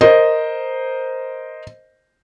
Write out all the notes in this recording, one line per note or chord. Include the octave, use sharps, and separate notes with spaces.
A#4 C5 D#5